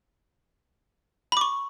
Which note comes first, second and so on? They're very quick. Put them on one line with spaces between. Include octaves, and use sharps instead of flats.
B5 D6 C#6